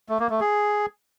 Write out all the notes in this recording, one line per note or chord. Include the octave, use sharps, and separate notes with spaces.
A3
A#3
A3
G#4